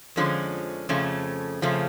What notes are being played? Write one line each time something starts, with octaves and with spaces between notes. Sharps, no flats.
F2 D3 F3 G#3 C#4
F2 C#3 F3 A3 C#4
F2 C#3 F3 A3 C#4